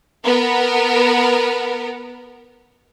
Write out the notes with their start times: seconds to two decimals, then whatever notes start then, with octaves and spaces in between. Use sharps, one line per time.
0.24 B3 A#4